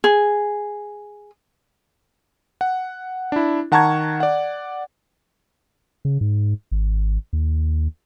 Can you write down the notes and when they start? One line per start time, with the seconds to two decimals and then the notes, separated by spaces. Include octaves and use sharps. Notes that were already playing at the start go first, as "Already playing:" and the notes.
0.04 G#4
2.61 F#5
3.32 D4 E4
3.72 D#3 F#5 A5 A#5 C#6 G#6
4.20 D5 F#5
6.05 C#3
6.21 G#2
6.71 G#1
7.33 D#2